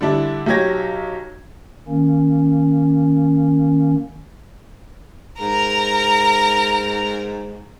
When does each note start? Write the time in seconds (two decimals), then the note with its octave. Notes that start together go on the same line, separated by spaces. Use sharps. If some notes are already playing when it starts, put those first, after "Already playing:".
0.01 D3 G3 D4 E4
0.46 B1 F#3 G4 C#5 G#6 A#6
1.88 D#3 A#3 C#4
5.40 G#2 A#4 A#5